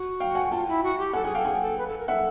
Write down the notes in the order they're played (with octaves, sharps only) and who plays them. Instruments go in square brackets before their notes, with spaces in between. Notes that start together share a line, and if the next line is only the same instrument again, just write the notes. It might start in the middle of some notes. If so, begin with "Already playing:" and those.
Already playing: [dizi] F#4
[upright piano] F5 G5
F#5 G#5
[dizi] F4 [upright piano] G5 A5
[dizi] E4
F#4
G4
[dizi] A4 [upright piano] F#5 G#5
[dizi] G#4 [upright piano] F#5 G#5
[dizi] A4 [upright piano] F5 G5
[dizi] G#4 [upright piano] F#5 G#5
[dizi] A4
B4
A4
A#4
[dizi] A4 [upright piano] E5 F#5